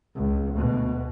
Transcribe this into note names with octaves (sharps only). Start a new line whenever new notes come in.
C#2
D2 B2